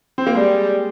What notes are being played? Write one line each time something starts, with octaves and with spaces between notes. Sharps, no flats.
C4
A#3
G3 G#3